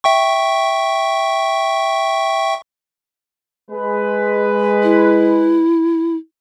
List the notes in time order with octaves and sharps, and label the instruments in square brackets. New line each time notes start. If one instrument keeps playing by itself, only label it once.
[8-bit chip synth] E5 G5 C#6
[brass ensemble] G#3 B4
[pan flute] E4